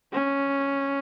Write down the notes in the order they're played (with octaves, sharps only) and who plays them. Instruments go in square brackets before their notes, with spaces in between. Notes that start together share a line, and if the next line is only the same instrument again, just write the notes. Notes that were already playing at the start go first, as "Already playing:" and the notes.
[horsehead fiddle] C#4